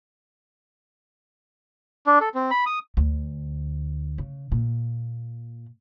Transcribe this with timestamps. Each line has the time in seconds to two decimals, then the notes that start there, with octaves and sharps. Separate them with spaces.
2.07 D4
2.21 A4
2.34 C4
2.51 B5
2.66 D#6
2.97 D2
4.18 C#3
4.52 A#2